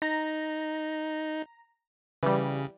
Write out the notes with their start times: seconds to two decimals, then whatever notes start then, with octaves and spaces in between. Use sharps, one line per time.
0.02 D#4 A#5 A#6
2.23 C#3 E3 G3